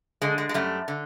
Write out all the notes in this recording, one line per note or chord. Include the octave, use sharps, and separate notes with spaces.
D3 G#3
G#3
G#3
F#2 G3 A3
D3